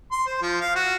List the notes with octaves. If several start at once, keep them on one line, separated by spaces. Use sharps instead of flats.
C6
C5
F3
F5
F#4